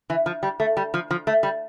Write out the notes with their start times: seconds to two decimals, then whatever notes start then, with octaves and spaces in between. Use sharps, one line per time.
0.10 E3
0.26 F3
0.43 G3
0.60 A3
0.77 G3
0.94 F3
1.11 F3
1.27 A3
1.43 G3